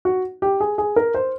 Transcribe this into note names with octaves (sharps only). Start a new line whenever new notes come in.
F#4
G4
G#4
G#4
A#4
C5